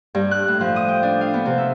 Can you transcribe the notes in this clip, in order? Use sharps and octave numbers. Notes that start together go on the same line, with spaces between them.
G2
F#6
A2
F3
D#6
G5
D4
F5
B3
C3
E5